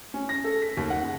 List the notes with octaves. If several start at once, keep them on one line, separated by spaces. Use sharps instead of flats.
C#4
A#6
A4
B6
D#2
F#5
C#3